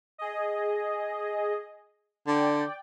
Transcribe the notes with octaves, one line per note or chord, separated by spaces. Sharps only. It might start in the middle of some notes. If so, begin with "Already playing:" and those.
G#4 D#5
D3 D5 G5